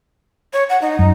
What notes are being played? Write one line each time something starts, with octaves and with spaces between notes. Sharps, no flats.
C#5
F#5
D#4
F#2